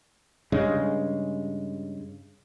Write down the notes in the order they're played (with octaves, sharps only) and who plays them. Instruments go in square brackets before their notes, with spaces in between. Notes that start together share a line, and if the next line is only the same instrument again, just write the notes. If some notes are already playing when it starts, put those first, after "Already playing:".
[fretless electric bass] G2 C#3 G#3